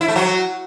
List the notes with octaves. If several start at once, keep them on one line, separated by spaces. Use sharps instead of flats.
E4
A3
F#3